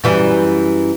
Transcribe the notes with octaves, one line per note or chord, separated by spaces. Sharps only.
F#2 E3 G3